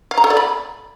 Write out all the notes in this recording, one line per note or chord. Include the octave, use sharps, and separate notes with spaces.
F5
A#5
A4
D5
B5